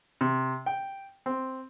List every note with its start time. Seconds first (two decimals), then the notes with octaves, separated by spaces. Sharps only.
0.21 C3
0.66 G5
1.26 C4